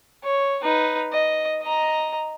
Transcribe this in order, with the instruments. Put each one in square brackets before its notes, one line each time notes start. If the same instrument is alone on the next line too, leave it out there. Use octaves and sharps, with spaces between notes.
[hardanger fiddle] C#5
D#4 B4
D#5
D#5 A#5